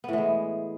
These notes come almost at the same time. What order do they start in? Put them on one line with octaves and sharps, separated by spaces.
B3 A2 E3 G#3